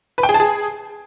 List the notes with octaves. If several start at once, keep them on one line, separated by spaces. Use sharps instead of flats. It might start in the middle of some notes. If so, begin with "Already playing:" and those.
B4
G5
G#4
A5
G#4